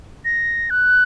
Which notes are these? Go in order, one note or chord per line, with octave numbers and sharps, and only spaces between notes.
A#6
F#6